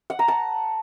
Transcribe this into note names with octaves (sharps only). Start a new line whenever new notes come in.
F#5
A#5
A5